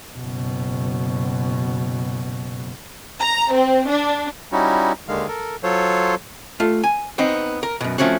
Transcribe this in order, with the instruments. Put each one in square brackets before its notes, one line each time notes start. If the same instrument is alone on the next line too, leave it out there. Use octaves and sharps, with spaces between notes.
[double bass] F#1 B2
[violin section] A#5
C4
D4
[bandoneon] G3 C#4 D#4 E4 F#4
D#2 D3 D#3 G#3 F5
A4 A#4
F#3 F4 A4 C5 C#5
[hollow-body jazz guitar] A3 F4
G#5
B3 C4 D#4
A#4
F#2 B2
F3 A3 C4 C#4 F#4